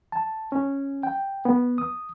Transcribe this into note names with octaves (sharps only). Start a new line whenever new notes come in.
A5
C#4
G5
B3
D#6